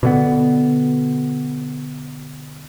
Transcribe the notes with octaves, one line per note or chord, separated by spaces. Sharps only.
B2 D3 B3